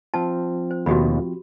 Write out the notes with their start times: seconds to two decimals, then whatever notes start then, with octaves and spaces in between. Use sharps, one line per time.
0.14 F3 C4 F4 A5
0.71 C5
0.86 D#2 B2 F#4 G4 B5